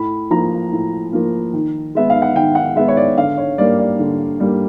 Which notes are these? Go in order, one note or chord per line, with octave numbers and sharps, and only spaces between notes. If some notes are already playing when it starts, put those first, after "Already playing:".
Already playing: A2 B5
F3 A#3 A#5
A2
F3 A#3
D#3
G#3 B3 E5
F5
F#5
D#3 G5
F#5
G#3 B3 E5
C#5
D5
D3 F5
C#5
G3 A#3 D5
D5
D3
G3 A#3